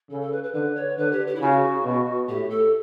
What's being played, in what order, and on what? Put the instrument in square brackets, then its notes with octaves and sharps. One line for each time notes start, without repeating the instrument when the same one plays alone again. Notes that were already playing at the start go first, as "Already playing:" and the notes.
[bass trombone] C#3 [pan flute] A4
[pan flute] A4
B4
B4
[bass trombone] D3 [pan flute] B4
[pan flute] C#5
[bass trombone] D3 [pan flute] B4
[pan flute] G4
G4
E4
[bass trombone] C#3 [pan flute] F#4
[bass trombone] B2
[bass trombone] A2 [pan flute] G4
[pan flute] A4